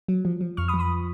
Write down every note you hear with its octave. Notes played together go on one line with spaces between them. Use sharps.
F#3
F3
F3
F2 C#6 F6
B5 D#6
F3
B5 D#6